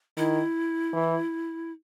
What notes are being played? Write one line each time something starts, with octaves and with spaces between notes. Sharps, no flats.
D#3 E4
E3